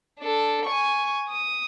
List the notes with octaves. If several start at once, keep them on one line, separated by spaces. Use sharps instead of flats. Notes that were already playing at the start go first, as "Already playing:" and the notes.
D4 A4
G#5 C#6
D#6